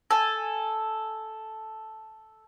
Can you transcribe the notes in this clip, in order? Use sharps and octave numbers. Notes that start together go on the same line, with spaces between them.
A4 G#5